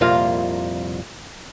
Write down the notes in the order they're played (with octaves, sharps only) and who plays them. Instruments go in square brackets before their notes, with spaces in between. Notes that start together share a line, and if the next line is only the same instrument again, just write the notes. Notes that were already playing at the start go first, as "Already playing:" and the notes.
[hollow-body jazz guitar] C2 F2 A#2 A#3 F4 F5